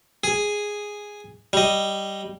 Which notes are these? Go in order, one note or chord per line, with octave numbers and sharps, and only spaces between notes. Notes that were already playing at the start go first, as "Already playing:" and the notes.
G#4
G3 D#5